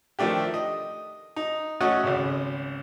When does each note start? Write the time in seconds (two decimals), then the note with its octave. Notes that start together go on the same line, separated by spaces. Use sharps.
0.19 D#3 F3 A3 D4 G4
0.54 D#5
1.36 D#4
1.80 A3 C#4 F#4 D#5 F#5
2.03 G#1 C#2